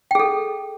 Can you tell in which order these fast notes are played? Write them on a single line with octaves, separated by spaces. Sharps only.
G5 G#4 A4